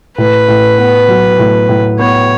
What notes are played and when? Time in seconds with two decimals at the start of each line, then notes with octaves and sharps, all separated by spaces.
0.17 A2 B4
0.48 A2
0.78 B3
1.08 F#3
1.39 A2
1.69 A2
1.99 B3 C#5